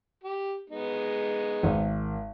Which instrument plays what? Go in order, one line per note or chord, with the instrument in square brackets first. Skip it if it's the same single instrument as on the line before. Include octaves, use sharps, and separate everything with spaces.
[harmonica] G4
G#3 B3 D#4
[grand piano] G#1